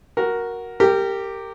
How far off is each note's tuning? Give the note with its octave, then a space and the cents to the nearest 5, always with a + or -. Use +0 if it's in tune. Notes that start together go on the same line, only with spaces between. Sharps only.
F#4 +0 A#4 +5
G4 +0 A#4 -25